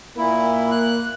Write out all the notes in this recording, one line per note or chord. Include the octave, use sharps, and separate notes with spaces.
A#2 A#3 E4
F#6